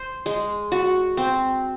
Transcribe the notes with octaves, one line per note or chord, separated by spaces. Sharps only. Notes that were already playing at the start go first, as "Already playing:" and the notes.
Already playing: C5
G#3
F#4
C4